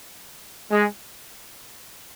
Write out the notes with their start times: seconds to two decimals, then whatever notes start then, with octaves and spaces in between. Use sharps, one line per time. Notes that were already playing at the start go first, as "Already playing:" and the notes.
0.71 G#3